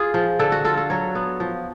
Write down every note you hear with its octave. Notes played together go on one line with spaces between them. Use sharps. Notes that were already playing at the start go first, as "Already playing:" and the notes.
Already playing: F4 G#4
F3
D3 A4
F#4
F4 A4
A4
F#3 C#5
B3
F3